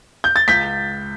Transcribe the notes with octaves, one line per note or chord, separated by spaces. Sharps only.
G6
A6
C#2 G6 B6